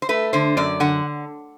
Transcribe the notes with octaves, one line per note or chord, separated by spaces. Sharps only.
C5
A3 B4
D3 C5
F#2 D5
D3 F#5